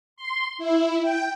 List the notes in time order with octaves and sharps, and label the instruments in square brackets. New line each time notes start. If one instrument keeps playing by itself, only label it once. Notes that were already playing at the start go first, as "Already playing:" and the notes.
[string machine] C6
E4
G5